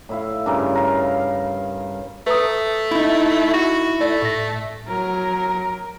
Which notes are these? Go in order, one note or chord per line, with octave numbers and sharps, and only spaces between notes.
A2 E4 F5
G2 C#3 A#4
A#4 F5
A3 B4 A#5 D#6
D#4 E4
F#4
A3 D5
A2 A#6
F#3 A#4